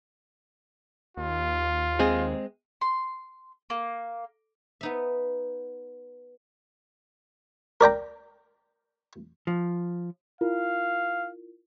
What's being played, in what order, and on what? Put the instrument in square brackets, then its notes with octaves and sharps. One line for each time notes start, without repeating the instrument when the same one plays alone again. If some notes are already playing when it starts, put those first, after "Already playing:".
[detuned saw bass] D#2 [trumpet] F4
[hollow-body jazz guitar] G#3 C4 G#4
[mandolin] C6
A#3
[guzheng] B3 D#4 E5
[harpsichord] A#4 D5 G5 A#5
[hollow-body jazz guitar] F3
[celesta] E4 F4 A#4 [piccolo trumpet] F5